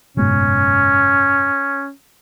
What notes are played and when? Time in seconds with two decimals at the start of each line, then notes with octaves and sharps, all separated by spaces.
0.17 F#1 G#2 B2 C#4